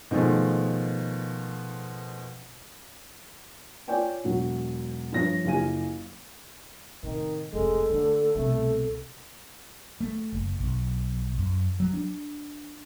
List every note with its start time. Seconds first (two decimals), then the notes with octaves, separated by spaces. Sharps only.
0.11 B2 D#3 F3 G#3 A3
3.88 F4 C#5 D5 G5 G#5
4.24 E1 F#3
5.12 G2 F3 C#5 A#6
5.44 F#1 F4 G4 F5 G#5 D#7
7.03 A2 C3 D#3
7.53 F1 D2 G#3 A4
7.90 D3 A3
8.35 C2 B2 A3
10.01 A3
10.32 F#1
10.59 B1
11.38 F#2
11.80 F#3
11.93 D4